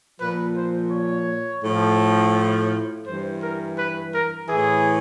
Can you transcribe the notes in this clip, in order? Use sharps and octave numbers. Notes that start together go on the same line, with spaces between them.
A#2 F3 B4
C5
C#5
A2 F3
G2 C5
E3
A#4
B4
A#4
A2 E3 G#4